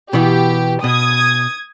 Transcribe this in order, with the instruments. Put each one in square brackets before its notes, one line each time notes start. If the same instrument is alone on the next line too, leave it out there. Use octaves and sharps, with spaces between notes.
[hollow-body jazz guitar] B2 E3 B3 [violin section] G4
[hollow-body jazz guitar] B2 [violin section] D#6 G#6